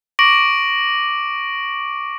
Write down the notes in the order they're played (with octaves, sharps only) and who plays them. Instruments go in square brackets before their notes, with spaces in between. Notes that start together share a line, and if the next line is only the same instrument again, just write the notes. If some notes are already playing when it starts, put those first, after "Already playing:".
[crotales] C#6 D6 A#6 D7 F#7